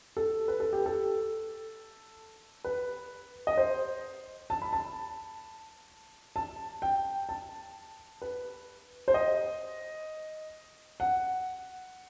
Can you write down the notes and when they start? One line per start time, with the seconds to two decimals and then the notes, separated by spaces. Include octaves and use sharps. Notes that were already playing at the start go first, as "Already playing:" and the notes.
0.17 A4
0.48 B4
0.60 A4
0.73 G4
0.86 A4
2.65 B4
3.47 D#5
3.57 C5
4.50 A5
4.62 B5
4.73 A5
6.36 A5
6.82 G5
7.29 A5
8.22 B4
9.08 C5
9.14 D#5
11.00 F#5